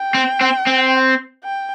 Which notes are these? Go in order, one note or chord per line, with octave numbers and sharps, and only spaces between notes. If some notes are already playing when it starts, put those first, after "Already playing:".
Already playing: G5
C4
C4
C4
G5